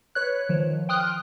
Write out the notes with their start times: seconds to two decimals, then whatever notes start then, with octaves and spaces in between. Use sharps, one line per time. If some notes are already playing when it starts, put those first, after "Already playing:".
0.15 B4 C#5 F#6
0.49 D#3 F3
0.89 G5 C6 D#6 F6 F#6